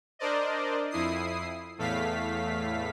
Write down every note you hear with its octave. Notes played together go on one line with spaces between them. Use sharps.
D4 A#4 C5 D5 D#5
F2 E4 D#6 C7
E2 A2 A3 F5 B6